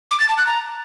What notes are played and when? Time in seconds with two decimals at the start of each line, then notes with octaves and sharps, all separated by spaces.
0.11 D6
0.20 A6
0.29 A5
0.38 F#6
0.47 A#5